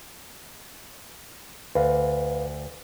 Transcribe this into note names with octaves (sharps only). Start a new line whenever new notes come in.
D2 B4 F5